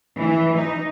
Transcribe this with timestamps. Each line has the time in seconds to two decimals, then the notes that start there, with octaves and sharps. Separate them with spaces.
0.18 E3
0.56 D#4